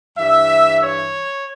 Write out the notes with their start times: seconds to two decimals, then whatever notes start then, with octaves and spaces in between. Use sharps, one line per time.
0.18 G2 E3 E5
0.82 C#5